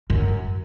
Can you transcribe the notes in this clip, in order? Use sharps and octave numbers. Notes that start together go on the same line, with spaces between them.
F#2